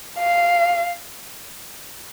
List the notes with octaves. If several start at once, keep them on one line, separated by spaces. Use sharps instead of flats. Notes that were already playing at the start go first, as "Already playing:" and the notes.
F5